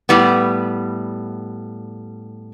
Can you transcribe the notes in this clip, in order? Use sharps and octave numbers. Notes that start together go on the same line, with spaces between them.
A2 G3 B3